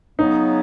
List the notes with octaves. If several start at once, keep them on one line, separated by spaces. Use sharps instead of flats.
C#3 F#3 B3 D#4